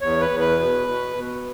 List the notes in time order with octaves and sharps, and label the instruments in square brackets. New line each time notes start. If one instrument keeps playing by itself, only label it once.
[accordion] E2 C#5
B4
E2
B4
B2
B2
B2